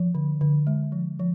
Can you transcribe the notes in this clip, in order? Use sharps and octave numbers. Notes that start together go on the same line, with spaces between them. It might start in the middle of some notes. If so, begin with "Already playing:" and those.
Already playing: F3
D3
D3
G#3
F3
F3